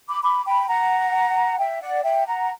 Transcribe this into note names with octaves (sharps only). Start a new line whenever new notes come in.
B5 D6
B5 D6
G5 B5
F#5 A#5
E5 G5
D5 F#5
E5 G5
F#5 A#5